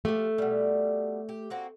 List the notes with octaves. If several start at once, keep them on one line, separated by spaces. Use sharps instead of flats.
F3 A3 G4
B2 G3
G4
A#3 C4 F#4